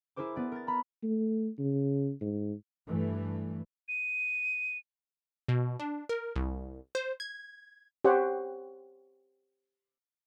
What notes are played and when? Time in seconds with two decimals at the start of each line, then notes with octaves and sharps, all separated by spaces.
0.16 E4 G#4 A#4 C5 D6
0.36 B3 D5
0.52 A#4 A6
0.67 A#5 B5
1.03 A3
1.59 C#3
2.21 G#2
2.88 G2 E3 A3
3.88 D#7
5.48 B2
5.80 D4
6.09 A#4
6.36 C2
6.95 C5
7.20 G#6
8.04 G4 C5 C#5 F#5 G5